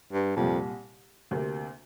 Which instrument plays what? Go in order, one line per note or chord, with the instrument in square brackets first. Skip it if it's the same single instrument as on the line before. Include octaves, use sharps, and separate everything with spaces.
[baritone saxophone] G2
[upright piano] C2 A#2 G3 [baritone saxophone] F2
[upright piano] D2 C3 A#3